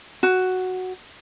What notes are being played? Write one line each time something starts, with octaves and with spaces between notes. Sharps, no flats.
F#4